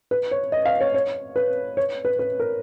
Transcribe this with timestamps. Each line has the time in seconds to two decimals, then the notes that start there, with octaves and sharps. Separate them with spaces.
0.11 B4
0.31 C#5
0.52 D#5
0.65 F5
0.81 C#5
0.94 C#5
1.36 B4
1.77 C#5
2.05 B4
2.19 B4
2.40 A#4